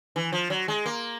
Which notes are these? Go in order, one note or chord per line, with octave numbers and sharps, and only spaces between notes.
E3
F3
F#3
G#3
A#3